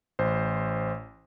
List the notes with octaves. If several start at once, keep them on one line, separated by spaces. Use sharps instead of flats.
A1 C5